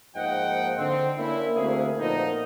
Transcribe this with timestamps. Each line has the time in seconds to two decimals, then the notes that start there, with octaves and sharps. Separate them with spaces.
0.15 G#2 F3 A#3 D#5 F#5 G5
0.78 D3 C4
1.18 A#3 C#4 D4 E4
1.54 D2 A#3 C4 E4 G#4
1.98 A#2 F3 B3 D#4